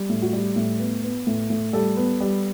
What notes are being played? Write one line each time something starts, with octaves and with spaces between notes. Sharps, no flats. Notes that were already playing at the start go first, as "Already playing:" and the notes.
Already playing: G3
A2
F#4
G3 G4
A2
B3
B3
A2
A2
G3 A4
B3
G3